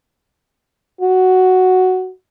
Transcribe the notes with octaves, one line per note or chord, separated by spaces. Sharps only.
F#4